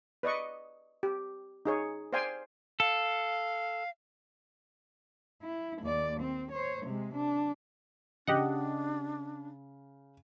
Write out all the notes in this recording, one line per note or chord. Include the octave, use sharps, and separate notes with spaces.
B4 D5 D#5 C#6
G4
D#4 G#4 C#5
C5 D5 F5 G5 G#5 C6
A4 F5
E4
D#2 D5
C4
C5 C#5
C3 G#3
D4
C#3 D4 G4 D#5 F#5